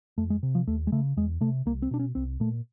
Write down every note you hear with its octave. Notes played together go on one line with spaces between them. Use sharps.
F2 A3
G#3
C3
F3
D#2 A3
G#3
C#3 A3
E2 G#3
C3 A3
C2 A#3
C4
B2 D4
C#4
C2 C4
A#2 A3